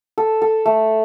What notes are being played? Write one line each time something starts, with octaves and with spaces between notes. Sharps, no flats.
A4
A4
A3